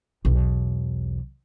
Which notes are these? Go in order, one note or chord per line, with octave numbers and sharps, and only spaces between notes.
B1 E2